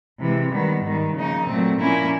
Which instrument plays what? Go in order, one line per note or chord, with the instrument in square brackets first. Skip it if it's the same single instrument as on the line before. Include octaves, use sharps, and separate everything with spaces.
[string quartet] C3 E3 G#3
D#3 G3 B3
G#2 D#3 G3
C#3 F3 A#3 D#4
A#2 F#3 A3 C4
A#2 F3 A#3 C#4 E4